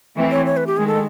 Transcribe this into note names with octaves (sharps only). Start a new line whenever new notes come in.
E3 A3 C4
C#5
C#5
B4
G4
D#3 G#3 G#4
A4